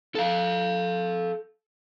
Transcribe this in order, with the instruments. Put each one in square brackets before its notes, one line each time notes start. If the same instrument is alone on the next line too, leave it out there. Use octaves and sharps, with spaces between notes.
[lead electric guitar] A4 F5